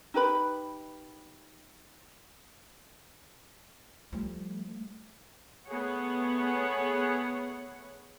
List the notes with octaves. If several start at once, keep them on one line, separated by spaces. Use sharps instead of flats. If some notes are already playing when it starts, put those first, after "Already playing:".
D#4 G4 B4 B5
F3 G3 A3
A3 B3 G#4 C#5 F#5